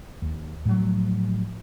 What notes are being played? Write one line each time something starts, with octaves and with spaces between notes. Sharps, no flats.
D#2
A2 F3 F#3 A3